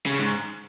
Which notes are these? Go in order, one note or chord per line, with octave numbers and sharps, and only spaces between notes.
C#3
G#2